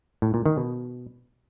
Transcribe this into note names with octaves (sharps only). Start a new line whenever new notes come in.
A2
A#2
D#3
B2